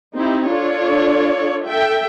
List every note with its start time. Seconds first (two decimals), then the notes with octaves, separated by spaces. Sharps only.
0.16 C4 D#4 E4 G4
0.49 D4 F4 A4 C#5 D5
1.66 A4 E5 G5